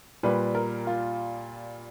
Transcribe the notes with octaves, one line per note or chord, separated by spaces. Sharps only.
A#2 G3 B4
A#4
F4